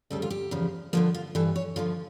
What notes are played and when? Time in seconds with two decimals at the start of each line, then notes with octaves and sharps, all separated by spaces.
0.10 D2 C#3 G3 A4
0.22 F4
0.30 G4
0.51 E2 C#3 F3
0.93 G2 D3 F3 A#3
1.14 F4
1.35 G2 E3 G3 A4
1.56 C#5
1.76 D2 D3 F3 F4